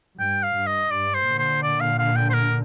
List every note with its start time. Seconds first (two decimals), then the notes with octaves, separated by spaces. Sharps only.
0.18 G2 G5
0.43 F5
0.55 G2
0.66 D#5
0.90 G2 D5
1.14 C5
1.26 A#2 D3
1.38 C5
1.63 D5
1.80 F5
1.98 F5
2.16 G5
2.30 C5
2.34 A#4